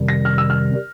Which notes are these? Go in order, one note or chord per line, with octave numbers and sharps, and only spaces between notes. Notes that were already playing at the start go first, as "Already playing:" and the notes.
Already playing: F2 C3 D#3 G3
A#6
F6
E6
F6